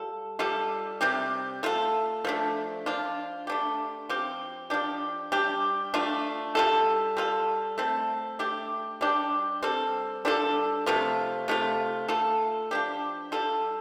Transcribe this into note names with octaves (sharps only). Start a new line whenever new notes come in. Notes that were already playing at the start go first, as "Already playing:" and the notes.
Already playing: G3 F4 A4
G3 F4 A4
C3 G3 C4 G4
A3 F4 A4
F3 A3 D4
F3 D4 F4
A3 D4 G4
F3 C4 G4
F3 D4 G4
G3 D4 G4
A3 D4 F4
G3 F4 A4
G3 F4 A4
A3 C4 A4
A3 D4 G4
G3 D4 G4
G3 C4 A4
G3 D4 F4 A4
C3 F3 A3 F4
C3 A3 F4
A3 F4 A4
F3 D4 G4
G3 F4 A4